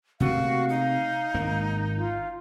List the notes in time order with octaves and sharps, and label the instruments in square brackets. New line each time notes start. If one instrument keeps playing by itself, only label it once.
[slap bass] C3 A3 A#3 [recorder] F#4 [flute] F5
[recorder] D#4
[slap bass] G#1 A#3
[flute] F4